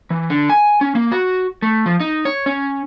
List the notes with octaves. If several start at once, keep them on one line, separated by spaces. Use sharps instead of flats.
E3
D3
G#5
C#4
A#3
F#4
A3
F3
D#4
C#5
C#4